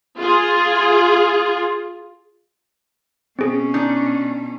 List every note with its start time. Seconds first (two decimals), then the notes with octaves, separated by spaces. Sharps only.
0.19 F4 G#4
3.39 B2 C4 C#4 G#4
3.74 D4 D#4